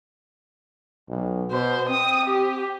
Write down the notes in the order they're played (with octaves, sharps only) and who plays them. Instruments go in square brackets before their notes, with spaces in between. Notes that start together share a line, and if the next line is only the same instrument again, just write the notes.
[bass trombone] B1
[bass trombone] B2 [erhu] C5
[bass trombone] C4 [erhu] D#6
[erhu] G4